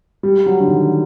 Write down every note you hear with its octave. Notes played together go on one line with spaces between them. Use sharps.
G3
F#3
D3
D#3